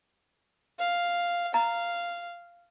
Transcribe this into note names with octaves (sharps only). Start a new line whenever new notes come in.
F5
F5 A#5